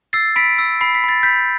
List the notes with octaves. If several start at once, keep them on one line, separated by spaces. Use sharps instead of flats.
E6 A6 C7
B5 B6 D7
E6
B5 C7
B6
B5 A6
B5 G6 B6